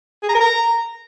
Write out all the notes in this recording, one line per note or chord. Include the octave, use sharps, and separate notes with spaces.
G#4
A#5
A#4
A#5